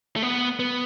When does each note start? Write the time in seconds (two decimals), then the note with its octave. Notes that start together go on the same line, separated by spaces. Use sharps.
0.16 A3
0.22 B3
0.59 B3